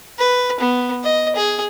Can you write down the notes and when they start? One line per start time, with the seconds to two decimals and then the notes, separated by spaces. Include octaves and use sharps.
0.19 B4
0.60 B3
1.03 D#5
1.36 G#4